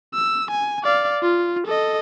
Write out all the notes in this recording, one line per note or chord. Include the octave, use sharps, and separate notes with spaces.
E6
G#5
D5 F5
F4
A4 D#5